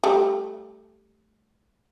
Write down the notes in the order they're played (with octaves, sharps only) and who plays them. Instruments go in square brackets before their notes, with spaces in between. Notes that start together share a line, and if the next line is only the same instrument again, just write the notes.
[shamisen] G3 A3